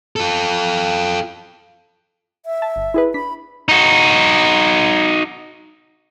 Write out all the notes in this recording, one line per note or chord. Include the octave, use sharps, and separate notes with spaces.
F4 A4
E5
A5
G1
E4 G#4 B4
D4 B5 B6
D#4 F#4